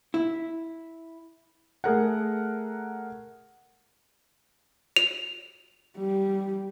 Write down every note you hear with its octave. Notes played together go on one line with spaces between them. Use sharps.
E4
A3 G#4 A#4 F#5
F7
G3